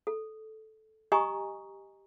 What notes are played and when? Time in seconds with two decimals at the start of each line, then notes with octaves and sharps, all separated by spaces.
0.07 A4
1.12 G4 D#5 G#5 A#5 C#6 D#6